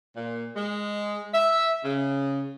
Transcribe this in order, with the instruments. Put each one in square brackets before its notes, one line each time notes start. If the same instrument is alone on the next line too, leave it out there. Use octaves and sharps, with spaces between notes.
[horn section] A#2
G#3
E5
C#3